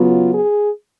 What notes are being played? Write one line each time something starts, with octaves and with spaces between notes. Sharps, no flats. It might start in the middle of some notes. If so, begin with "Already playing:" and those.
Already playing: C#3 F#3 B3 F4
G#4